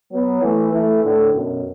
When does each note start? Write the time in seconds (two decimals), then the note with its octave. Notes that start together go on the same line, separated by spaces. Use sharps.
0.12 F#3 B3
0.43 E3 A3
0.73 E3 A3
1.04 A2 D3
1.34 F#2 B2